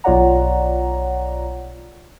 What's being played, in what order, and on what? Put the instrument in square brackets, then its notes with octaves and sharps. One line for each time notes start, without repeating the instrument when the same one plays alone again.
[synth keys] B1 F4 C#5 D5 F#5 A#5